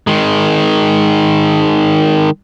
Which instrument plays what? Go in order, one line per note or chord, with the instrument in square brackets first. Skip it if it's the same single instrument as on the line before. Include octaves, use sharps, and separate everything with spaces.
[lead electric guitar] D#3 G#3